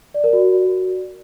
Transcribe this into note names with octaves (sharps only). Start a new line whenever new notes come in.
D5
A#4
F#4